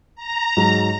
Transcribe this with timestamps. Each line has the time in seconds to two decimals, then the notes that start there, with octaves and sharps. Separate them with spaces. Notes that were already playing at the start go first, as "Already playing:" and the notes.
0.16 A#5
0.57 G#2 F#3